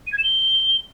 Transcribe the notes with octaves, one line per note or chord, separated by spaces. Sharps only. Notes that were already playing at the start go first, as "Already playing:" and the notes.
D#7
G#6
E7
G7